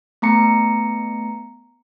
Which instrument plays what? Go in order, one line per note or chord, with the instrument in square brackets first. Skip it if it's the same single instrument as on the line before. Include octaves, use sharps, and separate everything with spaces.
[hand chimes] A3 B3 A#5 C#7